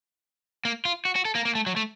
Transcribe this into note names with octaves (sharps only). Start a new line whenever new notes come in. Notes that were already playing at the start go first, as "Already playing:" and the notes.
A#3
F4
F#4
F#4
A4
A#3
A#3
A3
F#3
A3